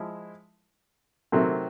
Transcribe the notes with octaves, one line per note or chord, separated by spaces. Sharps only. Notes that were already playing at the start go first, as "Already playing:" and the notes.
Already playing: F3 G#3 E4
C3 D#3 F#3 A3 C4